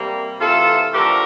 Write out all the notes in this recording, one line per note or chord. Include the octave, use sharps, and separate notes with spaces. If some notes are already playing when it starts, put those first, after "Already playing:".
Already playing: C3 G3 A#3
C3 E3 A3 F4 A4
D3 F3 A3 G4 A#4